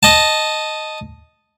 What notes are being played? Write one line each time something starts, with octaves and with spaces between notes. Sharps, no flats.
D#5 A5